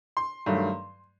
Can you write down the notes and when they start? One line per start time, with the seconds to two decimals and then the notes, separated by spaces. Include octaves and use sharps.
0.17 C6
0.46 G2 D#3 F#3 A3